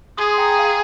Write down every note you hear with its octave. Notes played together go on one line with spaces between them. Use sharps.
G#4 C6 D#6
C6
G5 A#5
F5 G#5